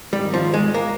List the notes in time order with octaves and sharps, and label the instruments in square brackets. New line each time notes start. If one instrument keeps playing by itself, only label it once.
[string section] G#1 G#2 D#3 [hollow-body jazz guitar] G3
[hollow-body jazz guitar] F3
G#3
A#3